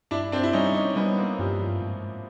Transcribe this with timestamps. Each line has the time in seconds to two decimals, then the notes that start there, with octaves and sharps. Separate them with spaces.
0.11 G2 D4 E4
0.32 C4 D4
0.43 E4
0.53 G3 C#4 D#4
0.74 C#4 D#4
0.96 G3 B3 C#4
1.18 A#3 C4
1.38 G2 F3 G3
1.60 F3
1.81 G#2